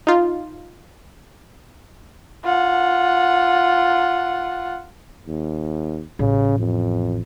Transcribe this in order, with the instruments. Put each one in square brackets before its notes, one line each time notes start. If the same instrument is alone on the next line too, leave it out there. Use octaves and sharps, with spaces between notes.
[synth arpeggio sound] D#4 F4
[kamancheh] F4 F#5
[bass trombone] D#2
[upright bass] A1 [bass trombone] C#3
[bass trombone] F2